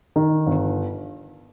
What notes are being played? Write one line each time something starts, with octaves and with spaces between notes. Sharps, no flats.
D#3
G1